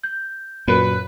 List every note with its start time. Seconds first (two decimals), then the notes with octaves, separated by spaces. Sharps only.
0.03 G6
0.68 F#2 A#2 F#4 B4